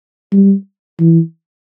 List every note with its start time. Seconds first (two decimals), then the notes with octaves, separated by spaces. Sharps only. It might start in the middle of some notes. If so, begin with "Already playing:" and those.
0.32 G3
0.99 E3